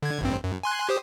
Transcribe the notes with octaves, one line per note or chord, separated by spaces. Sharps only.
D3 G#6
A1 G2 C4
F#2
G#5 C6 F#6
G4 C5 D#6